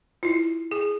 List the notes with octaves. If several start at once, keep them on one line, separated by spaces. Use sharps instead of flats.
E4 F4
G#4